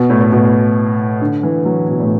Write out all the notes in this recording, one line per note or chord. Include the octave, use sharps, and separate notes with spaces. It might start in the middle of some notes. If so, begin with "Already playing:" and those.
Already playing: B2
A2
A2
B2
D3
E3
F#3
B2
A2